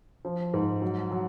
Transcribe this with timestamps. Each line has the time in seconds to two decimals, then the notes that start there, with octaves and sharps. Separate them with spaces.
0.25 F3
0.54 G#2
0.82 F#3
1.11 F#3